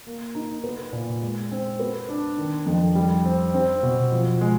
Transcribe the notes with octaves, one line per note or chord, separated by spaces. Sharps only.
A#3
D#4
B3
A#2
G#3
C4
B3
D4
D#3
F2
G3
C4
C4
B2
F3
G#3